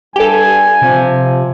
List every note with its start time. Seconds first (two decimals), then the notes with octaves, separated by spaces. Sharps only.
0.16 G2 G4 A4 G#5
0.82 C3 F3